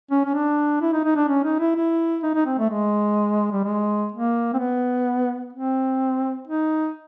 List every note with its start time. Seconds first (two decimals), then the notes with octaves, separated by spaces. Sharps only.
0.11 C#4
0.26 C#4
0.34 D4
0.82 E4
0.93 D#4
1.05 D#4
1.16 D4
1.28 C#4
1.44 D#4
1.60 E4
1.76 E4
2.23 D#4
2.35 D#4
2.46 C4
2.58 A3
2.70 G#3
3.52 G3
3.64 G#3
4.12 A#3
4.54 C4
4.58 B3
5.53 C4
6.47 D#4